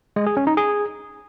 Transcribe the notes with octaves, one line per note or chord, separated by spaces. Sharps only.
G#3
G#4
C#4
D#4
G#4